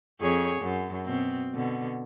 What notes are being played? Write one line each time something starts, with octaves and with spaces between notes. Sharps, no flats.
F2 G#4 C#5
F#2
B2 C4
B2 D3